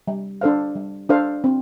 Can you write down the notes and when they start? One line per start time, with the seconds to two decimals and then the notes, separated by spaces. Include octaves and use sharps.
0.07 G3
0.41 D4 A4 C5 F5
0.75 G3
1.09 D4 A4 C5 F5
1.44 C4